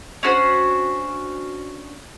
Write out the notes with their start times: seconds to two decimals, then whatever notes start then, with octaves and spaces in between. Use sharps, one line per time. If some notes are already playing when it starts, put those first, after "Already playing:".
0.23 C#4 D4 F#4 C5